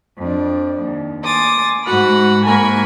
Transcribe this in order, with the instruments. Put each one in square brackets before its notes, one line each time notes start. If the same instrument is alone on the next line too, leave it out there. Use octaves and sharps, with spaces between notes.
[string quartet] F2 D4
D#2
G#5 C6 D6 D#6 A6
G#2 F#4 F#5 B5
G#2 A#3 A#4 G#5 B5 C#6